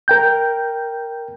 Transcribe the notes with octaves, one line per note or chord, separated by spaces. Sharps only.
A#4 G5 G6